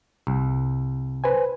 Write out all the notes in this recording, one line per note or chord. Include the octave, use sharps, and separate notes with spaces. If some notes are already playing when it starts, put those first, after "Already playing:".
C2
B4 C5 G#5